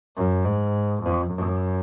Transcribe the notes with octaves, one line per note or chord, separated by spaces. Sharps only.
F#2
G#2
F2
F#2